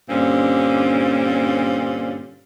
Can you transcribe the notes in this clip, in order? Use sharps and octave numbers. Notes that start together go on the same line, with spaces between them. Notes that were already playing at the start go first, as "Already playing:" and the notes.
G2 A#2 D3 C4 C#4